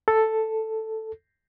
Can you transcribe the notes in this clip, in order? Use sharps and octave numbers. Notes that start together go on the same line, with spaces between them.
A4